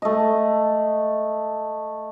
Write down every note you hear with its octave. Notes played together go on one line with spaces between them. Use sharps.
A3 D#5